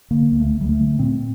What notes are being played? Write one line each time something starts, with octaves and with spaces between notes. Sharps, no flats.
D3 A#3
D2
A3
D2
G3
A3
D3
A#2 C4